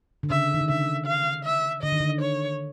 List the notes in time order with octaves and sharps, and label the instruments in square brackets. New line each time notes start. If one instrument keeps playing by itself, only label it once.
[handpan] D3
[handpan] C#3 [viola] E5
[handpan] D#3
D3
[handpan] C#3 [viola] E5
[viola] F5
E5
[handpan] D3 [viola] D#5
[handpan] D#3
D3
[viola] C#5